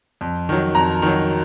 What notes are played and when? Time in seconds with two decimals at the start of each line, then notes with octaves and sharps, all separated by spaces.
0.21 F2
0.49 D#3 F#3
0.75 F2 A#5
1.02 D#3 F#3